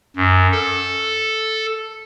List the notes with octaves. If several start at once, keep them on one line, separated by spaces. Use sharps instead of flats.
F#2
A4